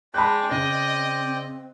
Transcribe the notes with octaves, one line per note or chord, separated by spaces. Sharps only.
G#3 D5 G5 A5 B5 F#6
C#3 C4 D#5